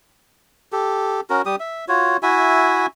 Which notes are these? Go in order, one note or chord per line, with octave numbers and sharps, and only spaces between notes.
G4 A4
C#4 F#4 A#4
G3 G4 D#6
E5
F4 F#4 C#5
E4 F#4 E5 G#5